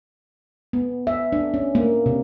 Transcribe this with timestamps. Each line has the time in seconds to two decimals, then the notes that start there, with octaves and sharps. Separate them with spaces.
0.73 B3
1.07 E5
1.32 D4
1.54 C#4
1.75 A#3
2.06 C3